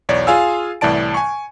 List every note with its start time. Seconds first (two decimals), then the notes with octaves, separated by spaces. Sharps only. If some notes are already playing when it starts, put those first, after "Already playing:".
0.09 B1 E2 C#5 D5
0.27 F4 G#4 F5 G#5 E6
0.81 C2 A2 E3 D5 A5 D7
1.14 G#5 C#6